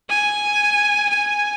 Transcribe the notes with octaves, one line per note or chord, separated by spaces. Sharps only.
G#5
G#5